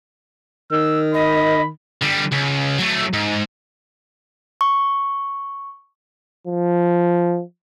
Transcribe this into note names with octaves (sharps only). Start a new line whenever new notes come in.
D#3 E6
D#5 B5
D3 G3
C#2
F#3 A3
G#2
C#6
F3